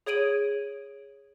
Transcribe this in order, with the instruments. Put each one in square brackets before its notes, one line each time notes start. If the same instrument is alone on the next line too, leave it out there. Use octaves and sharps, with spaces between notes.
[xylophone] G#4 C#5 G#6 D7 D#7 F#7